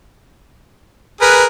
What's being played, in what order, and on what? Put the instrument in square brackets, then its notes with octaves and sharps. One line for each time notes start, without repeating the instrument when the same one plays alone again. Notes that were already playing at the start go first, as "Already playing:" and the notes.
[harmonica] G#4 A#4 [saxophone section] B4